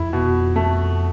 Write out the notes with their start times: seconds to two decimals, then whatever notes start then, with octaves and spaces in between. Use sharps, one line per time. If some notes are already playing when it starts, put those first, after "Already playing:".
Already playing: F2 E4
0.13 B2
0.56 A3